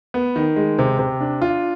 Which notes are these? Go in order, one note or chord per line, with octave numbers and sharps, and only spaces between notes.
B3
D#3
G#3
C3
C3
D4
F4